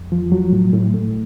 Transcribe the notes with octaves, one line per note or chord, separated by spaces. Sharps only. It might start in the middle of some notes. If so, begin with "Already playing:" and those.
Already playing: F2
F3
F#3
A2
A2
A3